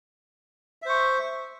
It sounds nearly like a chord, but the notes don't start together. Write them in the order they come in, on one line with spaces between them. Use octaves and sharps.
E5 C5 C#6